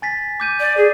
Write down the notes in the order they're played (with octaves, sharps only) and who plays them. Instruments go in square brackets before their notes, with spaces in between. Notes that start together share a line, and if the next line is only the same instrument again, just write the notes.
[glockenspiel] G#5 A6 B6
D6 G6 D#7
[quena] D5
G#4